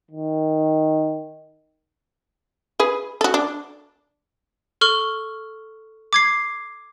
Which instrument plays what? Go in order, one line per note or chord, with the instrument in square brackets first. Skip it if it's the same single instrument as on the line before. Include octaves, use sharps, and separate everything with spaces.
[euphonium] D#3
[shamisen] G#4 B4
F#4 A4
D4
[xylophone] A4 C#6 F6 G7
D6 G#6 C7